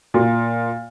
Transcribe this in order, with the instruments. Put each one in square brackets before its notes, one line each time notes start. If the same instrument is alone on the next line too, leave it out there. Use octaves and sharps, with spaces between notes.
[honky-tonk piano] A#2